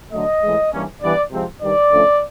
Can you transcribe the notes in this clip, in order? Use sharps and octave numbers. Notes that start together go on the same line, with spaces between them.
D3 F#3 A3 D#5
A2 E3 G#3
G2 E3 G3 A#3 C#4
G2 E3 G3 B3 D5
C3 F3 G#3 C4
G2 D#3 G3 D5
D3 F3 A3 C#4